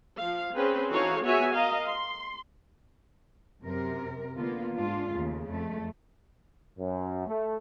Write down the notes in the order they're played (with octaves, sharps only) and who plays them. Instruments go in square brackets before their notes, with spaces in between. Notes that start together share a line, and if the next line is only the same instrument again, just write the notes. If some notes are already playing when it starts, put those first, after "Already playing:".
[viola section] F3 F5
C4 C#4 G#4 B4 C5
E3 D#4 F#4 A4 C#5 F5
B3 F#4 G#4 C#5 E5 G#5
A#4 D#5 F5
C6
[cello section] F#2 C3 A#4
D3 A#3 B3 F4
G#2 D4 F4
D#2 C#3 A3
F2 A3
[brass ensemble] F#2
A3